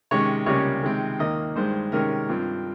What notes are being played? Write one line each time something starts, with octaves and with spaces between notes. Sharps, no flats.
C3 D#3 G#3 C#4 C#5
C#2 C3 G3 A#3 C#4 C#5
C3 D#3 G#3 C4
D#2 D#3 A#3 D#5
G2 D#3 G#3 C5
C3 D#3 G#3 C#4 A#4
G2 F3 C4